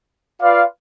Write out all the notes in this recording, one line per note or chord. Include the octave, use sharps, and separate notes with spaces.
F4 B4 D5 F5